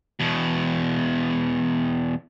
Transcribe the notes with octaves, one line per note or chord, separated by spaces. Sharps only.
E2 B2